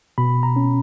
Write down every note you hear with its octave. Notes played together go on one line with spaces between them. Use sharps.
B2 B5
A#5
C#4